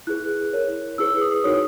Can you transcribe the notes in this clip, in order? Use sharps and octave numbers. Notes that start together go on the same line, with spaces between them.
E4 G#4 B4 F#6
E4 A#4 C#5
E4 G#4 B4 E6
D#6
D#4 F#4 A#4 C#5 D#6